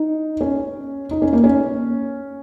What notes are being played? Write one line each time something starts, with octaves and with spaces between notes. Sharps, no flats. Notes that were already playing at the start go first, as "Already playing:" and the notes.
Already playing: D#4
C#4
D#4
C#4
A#3
C#4